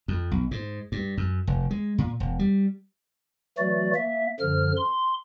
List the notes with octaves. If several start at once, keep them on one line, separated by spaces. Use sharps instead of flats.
F2
B1
G#2
G2
F#2
F1
G#3
A#2
E1
G3
E3 F#3 A3 F#4 D5
A#3 E5
F#2 D3 F3 F6
C6